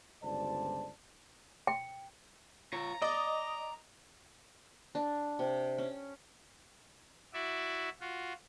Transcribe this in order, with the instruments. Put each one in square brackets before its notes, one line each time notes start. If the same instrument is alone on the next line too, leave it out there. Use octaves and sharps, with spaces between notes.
[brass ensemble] G1 C#2 G3 C5 D5 A5
[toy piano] G5
[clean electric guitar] F4 C#5 [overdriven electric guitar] A#5
[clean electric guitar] D5 [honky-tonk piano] D#5 D#6
[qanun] D4
C3
C#4
[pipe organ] E4 F#4 D5 E5
F4 F#4